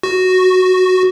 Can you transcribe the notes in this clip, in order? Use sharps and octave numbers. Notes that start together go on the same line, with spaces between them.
F#4